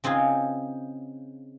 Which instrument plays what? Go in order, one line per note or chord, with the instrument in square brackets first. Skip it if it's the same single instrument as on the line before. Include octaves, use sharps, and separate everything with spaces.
[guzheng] C#3 C4 D#4 F4 G#4